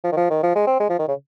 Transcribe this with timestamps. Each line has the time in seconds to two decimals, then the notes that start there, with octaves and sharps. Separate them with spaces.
0.04 F3
0.12 D#3
0.17 F3
0.30 D#3
0.43 F3
0.55 G#3
0.67 C4
0.80 G#3
0.89 F3
0.99 D#3
1.08 C#3